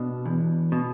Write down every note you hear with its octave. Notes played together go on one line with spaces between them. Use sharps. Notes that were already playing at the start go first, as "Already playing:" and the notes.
Already playing: B2 D4
E2
B2